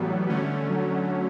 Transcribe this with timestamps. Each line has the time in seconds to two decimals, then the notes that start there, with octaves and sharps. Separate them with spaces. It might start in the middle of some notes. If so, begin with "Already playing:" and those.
Already playing: A2 E3 F#3 G3 B3
0.29 D3 A3 C#4
0.69 F#3